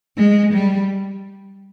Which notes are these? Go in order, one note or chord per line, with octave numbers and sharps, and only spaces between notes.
G#3
G3